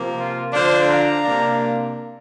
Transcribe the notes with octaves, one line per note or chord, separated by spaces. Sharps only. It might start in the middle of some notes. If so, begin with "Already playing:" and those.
Already playing: C3 F3 A#3
F4 A#4
D3 F3 D4 C5 F5
F5 A#5
C3 A#3 D4